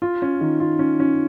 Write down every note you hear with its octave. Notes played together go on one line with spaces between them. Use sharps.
F4
C#4
D#3
F4
C#4
C#4